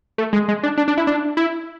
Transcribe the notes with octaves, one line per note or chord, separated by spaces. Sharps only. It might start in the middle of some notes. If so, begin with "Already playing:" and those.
A3
G#3
G#3
D4
D4
D4
E4
D4
E4